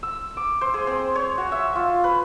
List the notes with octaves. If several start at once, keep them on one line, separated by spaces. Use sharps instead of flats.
E6
D6
C5
G#4
C4
C#5
F#4
E5
F4
B4